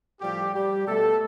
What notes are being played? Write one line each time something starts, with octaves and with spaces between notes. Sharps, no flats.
A2 F3 G3 G4
G3 G4
B2 A3 A4